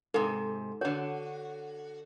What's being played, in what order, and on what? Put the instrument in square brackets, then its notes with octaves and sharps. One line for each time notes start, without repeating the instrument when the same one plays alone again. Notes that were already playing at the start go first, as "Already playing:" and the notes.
[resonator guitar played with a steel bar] G#2 C3 [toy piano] A4
[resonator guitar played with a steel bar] D3 F#4 [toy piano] C#5